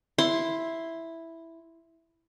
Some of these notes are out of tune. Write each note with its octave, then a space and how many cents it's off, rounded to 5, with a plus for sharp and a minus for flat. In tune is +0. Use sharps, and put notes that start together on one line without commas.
E4 +0 C6 +0